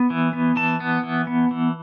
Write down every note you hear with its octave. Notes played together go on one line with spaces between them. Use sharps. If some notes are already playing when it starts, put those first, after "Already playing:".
Already playing: B3
E3
B3
E3 A5
B3
E3
B3
E3